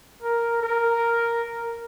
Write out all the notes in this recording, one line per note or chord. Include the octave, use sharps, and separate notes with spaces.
A#4
A#4